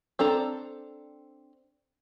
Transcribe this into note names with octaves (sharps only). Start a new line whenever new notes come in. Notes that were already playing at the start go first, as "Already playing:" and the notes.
C4 D4 A4 A#5